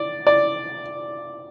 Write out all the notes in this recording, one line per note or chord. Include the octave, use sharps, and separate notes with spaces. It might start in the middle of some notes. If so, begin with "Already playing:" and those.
Already playing: D5
D5